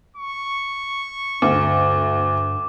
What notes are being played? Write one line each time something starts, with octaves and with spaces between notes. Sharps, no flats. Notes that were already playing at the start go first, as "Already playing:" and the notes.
C#6
D2 G2 D6